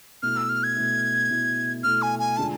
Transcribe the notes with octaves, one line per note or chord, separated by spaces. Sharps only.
B2 A3 E4 F6
E6
F6
G#6
B2 A3 E4
B2 A3 E4
B2 A3 E4 F6
G#5
G#5
D3 G#3 D4 F4 A5